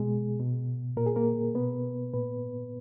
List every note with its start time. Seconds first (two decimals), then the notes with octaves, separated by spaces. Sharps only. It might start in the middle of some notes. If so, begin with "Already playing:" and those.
Already playing: B2 G#3 G#4
0.40 B2
0.97 A#2 A#4
1.06 G#4
1.16 A#3 A#4
1.55 B2 B3 B4
2.13 A#2 B3 B4